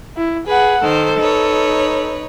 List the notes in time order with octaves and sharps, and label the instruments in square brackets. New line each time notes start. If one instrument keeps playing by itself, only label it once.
[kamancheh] E4
[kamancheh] G#4 F#5 [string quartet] B4
[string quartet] D#3 C5 [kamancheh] A4
[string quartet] D#4 B4 C#5